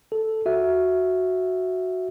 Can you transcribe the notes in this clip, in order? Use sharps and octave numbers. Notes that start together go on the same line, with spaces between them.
A4
F#4 E5